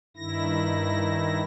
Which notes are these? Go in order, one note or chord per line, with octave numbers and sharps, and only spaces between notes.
G2 D#3 E4 A#6